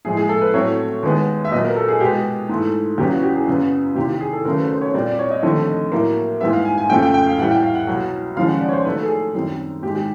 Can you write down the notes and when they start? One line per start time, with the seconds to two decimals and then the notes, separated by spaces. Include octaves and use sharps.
0.05 A2 F3 G#3 G#4
0.17 G#4
0.29 A4
0.41 B4
0.54 A2 F#3 A3 C4 C#5
1.03 D#2 D#3 G#3 B3
1.45 E5
1.51 A#2 F#3 B3 D#5
1.64 A#4
1.76 A4
1.88 G#4
2.00 B2 G#3 B3 G4
2.49 G#2 E3 A3
2.98 E2 C#3 F#3 B3 G4
3.11 F#4
3.23 G4
3.35 G#4
3.47 F#2 C#3 F#3 B3
3.96 E2 C3 D#3 G4
4.09 G4
4.20 G#4
4.33 A4
4.45 D#2 C#3 F#3 A3 A#4
4.58 B4
4.69 C5
4.81 C#5
4.94 A#2 G3 C4 D5
5.06 D5
5.19 C#5
5.31 D#5
5.43 D#2 D3 F3 A3 C4
5.92 A2 F#3 A#3
6.41 G#2 E3 G3 B3 E5
6.53 F5
6.65 G#5
6.78 G#5
6.90 F2 C#3 F3 A3 G5
7.02 G5
7.14 G5
7.26 F5
7.38 A2 E3 G3 F#5
7.51 G5
7.63 F5
7.75 F#5
7.87 C2 B2 F#3
8.36 D#2 C#3 F3 G#3 F5
8.48 F#5
8.60 D5
8.69 C#5
8.73 C5
8.85 D#2 D#3 F#3 A3 B4
8.97 A4
9.05 G#4
9.10 A4
9.35 F#2 D#3 G3 C4
9.83 G#2 D#3 G#3 G4
9.95 G4